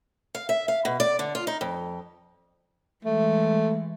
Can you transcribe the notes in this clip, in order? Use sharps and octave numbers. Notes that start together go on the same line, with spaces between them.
F5
E5
F5
B2
D5
D3
F4
D#4
F2
E3 G#3 A3